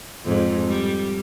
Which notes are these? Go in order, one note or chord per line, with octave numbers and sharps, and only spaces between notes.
F2 G#2
G3